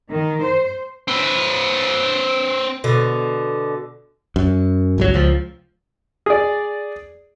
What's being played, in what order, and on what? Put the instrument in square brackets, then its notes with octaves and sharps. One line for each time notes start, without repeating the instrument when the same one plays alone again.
[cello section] D#3
C5
[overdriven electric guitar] C4 B4
[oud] B2 D3
[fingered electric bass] F#2
G1 C#2 F#3
C#2 F3
[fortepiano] G#4 D5